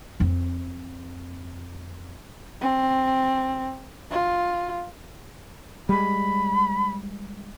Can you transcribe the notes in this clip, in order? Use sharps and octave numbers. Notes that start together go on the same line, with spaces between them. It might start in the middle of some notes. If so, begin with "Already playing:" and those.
F2 C4
C4
F4
G3 G#3 B5